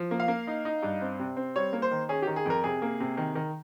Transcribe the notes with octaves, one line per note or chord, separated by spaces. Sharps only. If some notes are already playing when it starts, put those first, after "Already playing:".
Already playing: F3
A#3
F5
A#3
D#4
D#4
G2
C4
C3
C4
G3 C#5
A#3
C5
D#3
C#4 G#4
G4
D#3
G#4
F2 A#4
C3 G#4
A#3
C3
D#3
D#3